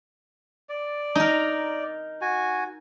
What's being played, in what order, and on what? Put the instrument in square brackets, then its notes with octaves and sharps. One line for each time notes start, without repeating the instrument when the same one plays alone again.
[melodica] D5
[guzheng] D#4 A#4
[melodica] F#4 G#5